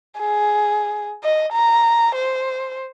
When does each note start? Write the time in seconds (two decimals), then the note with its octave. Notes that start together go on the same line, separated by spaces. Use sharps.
0.19 G#4
1.23 D#5
1.53 A#5
2.15 C5